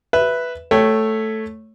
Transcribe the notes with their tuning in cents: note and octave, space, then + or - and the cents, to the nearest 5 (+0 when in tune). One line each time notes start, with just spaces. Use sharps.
B4 +0 E5 +0
A3 +0 C#5 +0 G5 +0